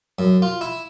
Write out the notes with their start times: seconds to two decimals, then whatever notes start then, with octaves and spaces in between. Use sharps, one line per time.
0.19 F#2
0.42 F4
0.61 E4